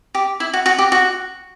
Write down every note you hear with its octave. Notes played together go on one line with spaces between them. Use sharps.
G4
E4
F#4
F#4
G4
F#4